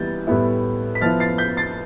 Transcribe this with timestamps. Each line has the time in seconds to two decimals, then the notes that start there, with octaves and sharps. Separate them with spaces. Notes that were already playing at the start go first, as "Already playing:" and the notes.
Already playing: E3 G3 B3 E4 G6 A6
0.27 A2 G3 B3 E4
0.95 B6
1.01 F3 B3 E4 F6 A6
1.20 A6 C7
1.38 G6 B6
1.57 A6 C7